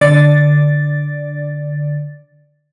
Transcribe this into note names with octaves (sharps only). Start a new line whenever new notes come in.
D3 D5 A6